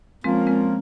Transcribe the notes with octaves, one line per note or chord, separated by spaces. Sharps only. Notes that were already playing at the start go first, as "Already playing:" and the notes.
F3 G#3 A#3 C4 C#4 F4 A#4
G#3 C4